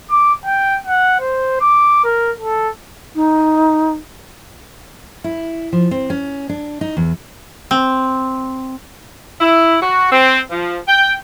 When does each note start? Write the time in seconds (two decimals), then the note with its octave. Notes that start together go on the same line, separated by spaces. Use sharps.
0.11 D6
0.46 G5
0.86 F#5
1.20 C5
1.61 D6
2.04 A#4
2.40 A4
3.15 D#4
5.24 E4
5.73 F3
5.91 C4
6.10 C#4
6.49 D4
6.81 D#4
6.97 E2
7.71 C4
9.41 E4
9.82 F#4
10.12 C4
10.51 F3
10.88 G5